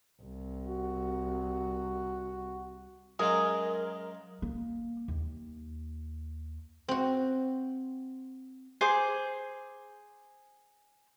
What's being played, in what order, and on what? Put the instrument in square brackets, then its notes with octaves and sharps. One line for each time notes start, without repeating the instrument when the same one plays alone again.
[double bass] C2
[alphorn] F#4
[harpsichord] F#2 G#3 F4 [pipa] G#4 [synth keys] A#4
[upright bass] A#3
D#2
[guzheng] C4 F#4
[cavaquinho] G#4 C5 D6